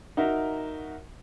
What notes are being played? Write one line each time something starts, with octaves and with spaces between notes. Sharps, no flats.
D#4 F#4 A#4 E5